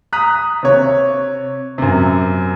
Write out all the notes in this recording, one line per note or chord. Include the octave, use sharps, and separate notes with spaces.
A#5 D#6 F#6 B6
C3 C#5
F#2 C3